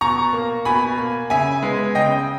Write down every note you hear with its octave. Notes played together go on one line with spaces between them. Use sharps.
B2 A#5 C#6
A#3
B2 G#5 B5
A#3
C#3 E5 G#5
G#3 B3
C#3 D#5 G5